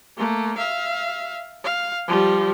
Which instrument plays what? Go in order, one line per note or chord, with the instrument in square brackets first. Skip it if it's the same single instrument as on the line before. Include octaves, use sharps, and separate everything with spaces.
[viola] A3 A#3
E5 F5
F5
F3 G3